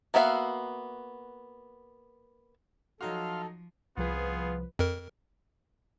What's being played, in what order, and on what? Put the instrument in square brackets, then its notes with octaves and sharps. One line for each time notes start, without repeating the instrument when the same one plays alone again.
[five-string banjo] A#3 B3 F#4 E5 F5
[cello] F3 [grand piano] F#3 D#4 F#4 [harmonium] A4 [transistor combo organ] F5 C6 F6
[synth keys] C2 F3 B4 [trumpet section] B3 F4 G#4
[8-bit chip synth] F2 A#4